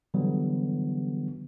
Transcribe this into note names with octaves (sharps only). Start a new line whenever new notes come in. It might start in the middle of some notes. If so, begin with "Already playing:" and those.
D3 E3 F#3 G3 B3